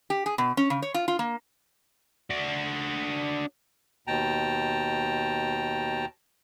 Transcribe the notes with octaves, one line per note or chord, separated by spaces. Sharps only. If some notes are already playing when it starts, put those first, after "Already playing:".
G4
G#4
B2
C#4
C#3
C#5
F4
F4
A#3
D4 F#4
D#2 B2 G5 A5 A#5